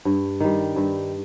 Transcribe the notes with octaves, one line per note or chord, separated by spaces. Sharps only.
G2
D#3 G3
G2